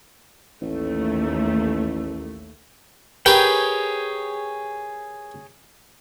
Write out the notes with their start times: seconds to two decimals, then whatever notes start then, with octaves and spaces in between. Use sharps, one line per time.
0.62 A1 D#2 A3
3.26 G4 G#4 A#4 B4 C#5 G5